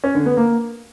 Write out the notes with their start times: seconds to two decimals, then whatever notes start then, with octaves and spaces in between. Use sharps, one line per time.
0.04 C#4
0.15 D3
0.26 B3
0.37 A#3